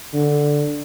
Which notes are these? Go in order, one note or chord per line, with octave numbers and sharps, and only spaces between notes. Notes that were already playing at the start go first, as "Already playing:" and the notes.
D3